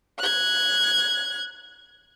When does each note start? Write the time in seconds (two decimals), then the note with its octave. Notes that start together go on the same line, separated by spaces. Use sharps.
0.19 F#6 G#6